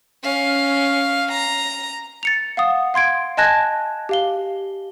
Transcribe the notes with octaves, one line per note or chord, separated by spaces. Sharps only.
C#4 F5
A#5
A6 C#7 F7
F5 F#5 D#6
F5 C6 G#6 D7
D#5 G#5 A5 F#6 G#6 A#6
G4 F5 G7